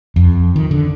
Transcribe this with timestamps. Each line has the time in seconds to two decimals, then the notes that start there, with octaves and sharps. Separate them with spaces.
0.16 F2
0.56 D#3
0.71 D3